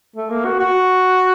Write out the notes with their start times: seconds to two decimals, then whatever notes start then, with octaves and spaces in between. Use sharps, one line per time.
0.16 A3
0.30 A#3
0.45 F#4
0.60 F#4